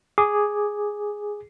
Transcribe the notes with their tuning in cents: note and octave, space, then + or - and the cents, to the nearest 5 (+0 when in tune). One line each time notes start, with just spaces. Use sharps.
G#4 +0 D6 +0